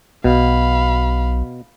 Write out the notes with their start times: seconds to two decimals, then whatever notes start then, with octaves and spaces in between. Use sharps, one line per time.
0.24 B1 B2 F5 B5